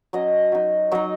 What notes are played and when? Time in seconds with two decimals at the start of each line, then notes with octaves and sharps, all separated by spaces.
0.13 F#3 C#4 D#5
0.52 F#3 D#4
0.92 F#3 D#4 D#5